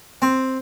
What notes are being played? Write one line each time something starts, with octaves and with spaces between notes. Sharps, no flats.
C4